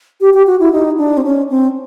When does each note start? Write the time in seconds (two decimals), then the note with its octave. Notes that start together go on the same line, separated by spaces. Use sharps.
0.21 G4
0.34 G4
0.47 F#4
0.60 E4
0.72 D#4
0.97 D4
1.17 C4
1.24 C#4
1.49 C4